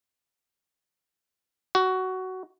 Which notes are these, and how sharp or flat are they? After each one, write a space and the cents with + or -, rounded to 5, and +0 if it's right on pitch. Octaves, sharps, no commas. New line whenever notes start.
F#4 +15